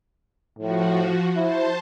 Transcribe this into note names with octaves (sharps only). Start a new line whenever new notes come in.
A2 F3 F#4
E4 C5 A5